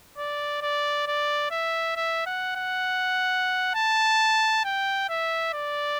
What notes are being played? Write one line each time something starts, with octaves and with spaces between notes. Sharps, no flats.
D5
D5
D5
E5
E5
F#5
F#5
A5
G5
E5
D5